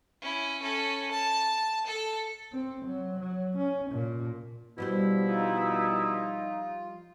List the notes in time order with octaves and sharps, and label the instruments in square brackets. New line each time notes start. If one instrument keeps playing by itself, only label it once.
[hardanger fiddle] C#4 E4
C#4 A4
A5
A4
[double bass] C4
F#3
F#3
C#4
A#2
[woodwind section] B2 E4 [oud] F3 G3 C5
[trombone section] D#4 [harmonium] F4